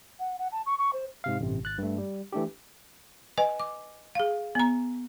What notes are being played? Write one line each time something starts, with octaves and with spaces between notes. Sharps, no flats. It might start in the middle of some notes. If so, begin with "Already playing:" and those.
F#5
F#5
A5
C#6
C#6
C5
G#2 C3 F5
A1 G2 C3
G#1 F#6 A6
G2 A3
G3
E3 A3 D4 G4
B4 D#5 G#5
D6
G#4 F5
B3 A#5